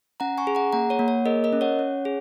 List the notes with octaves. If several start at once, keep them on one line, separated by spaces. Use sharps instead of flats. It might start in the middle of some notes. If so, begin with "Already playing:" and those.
C#4 F#5 A#5
G#5 C#6
G#4
F#5 A#5
A#3 F#5 A#5
C#5 F#5
A#3
C#5
G#4 A#4 D#5
A#4 D#5
C#4
C#5 F#5
C#4
G#4